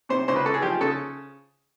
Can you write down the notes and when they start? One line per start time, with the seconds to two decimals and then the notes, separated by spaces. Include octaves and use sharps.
0.09 C3 C5
0.28 C#2 C5
0.36 B4
0.45 C#2 A4
0.54 G#4
0.62 F3 G4
0.81 C#3 A4